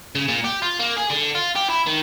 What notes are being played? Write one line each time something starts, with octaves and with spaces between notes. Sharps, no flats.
C#3
A#2
G4
F4
A#3
G#4
D3
F4
G4
E4
D#3